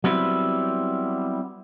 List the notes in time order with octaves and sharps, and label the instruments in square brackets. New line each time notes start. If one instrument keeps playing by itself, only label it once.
[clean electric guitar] F#3 G3 B3 C4 E4